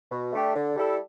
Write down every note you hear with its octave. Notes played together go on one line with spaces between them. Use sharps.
B2
A3 D4 G4
D3
G3 E4 A4